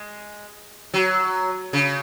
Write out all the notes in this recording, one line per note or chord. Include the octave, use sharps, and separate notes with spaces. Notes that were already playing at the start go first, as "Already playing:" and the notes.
Already playing: G#3
F#3
C#3